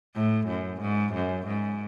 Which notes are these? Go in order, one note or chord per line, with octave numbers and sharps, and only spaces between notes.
A2
F#2
G#2
F#2
G#2